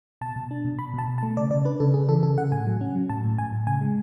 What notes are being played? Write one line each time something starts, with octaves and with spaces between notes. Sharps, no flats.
B2 A5
B2
D4
B2
B2 B5
B2 A5
B2
A5
A3
C#3 D5
C#3 D5
D4 B4
C#3 A4
C#3 G#4
E3 A4
C#3 A4
C#3 F#5
A2 G#5
F#3
C#4
F#3
A2 A5
A2
A2 G#5
A2
C#3 G#5
G#3